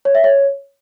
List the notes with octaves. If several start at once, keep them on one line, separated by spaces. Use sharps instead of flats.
C#5
E5
C#5